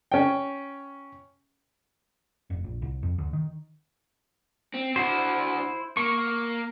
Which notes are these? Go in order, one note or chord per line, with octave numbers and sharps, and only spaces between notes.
C#4 G5
F1
A#1
C2
F2
D2
D#3
C4
D3 E4 F#4 C5
A#3 C#6